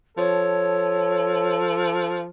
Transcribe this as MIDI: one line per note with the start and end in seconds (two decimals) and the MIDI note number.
0.17 2.28 53
0.17 2.24 69
0.17 1.55 73